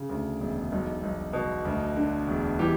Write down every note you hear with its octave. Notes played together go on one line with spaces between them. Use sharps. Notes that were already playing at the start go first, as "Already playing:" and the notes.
Already playing: C#3
D2
E1
B1
B1
B2
D2
D3
E1
E3 G4